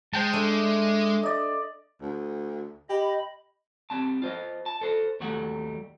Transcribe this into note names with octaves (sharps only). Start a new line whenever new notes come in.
G#3 C5 G5 A5
A3 D4
D5 D#5
D2
G4 D#5 B5
G3 C4 A5
F4 C5 D#5
A5
A4 C5
D#2 F#3 G3 A3 F#5